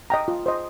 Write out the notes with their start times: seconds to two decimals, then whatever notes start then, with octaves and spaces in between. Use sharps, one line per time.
0.10 D#5 G5 A#5
0.28 F4
0.46 C5 D#5